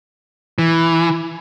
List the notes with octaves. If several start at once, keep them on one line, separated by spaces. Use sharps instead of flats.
E3